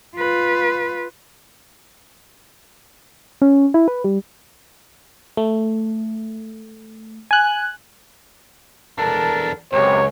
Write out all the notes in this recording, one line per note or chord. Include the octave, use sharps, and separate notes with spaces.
F4 B4
C#4
E4
B4
G3
A3
G#5 F#6
E2 D4 A4 A#4 A5
C#2 F#2 C3 C#5